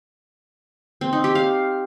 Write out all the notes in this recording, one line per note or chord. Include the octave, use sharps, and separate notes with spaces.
C4
D#4
G4
F5